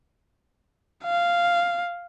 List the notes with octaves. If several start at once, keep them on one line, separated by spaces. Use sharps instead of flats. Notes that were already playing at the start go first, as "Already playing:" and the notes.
F5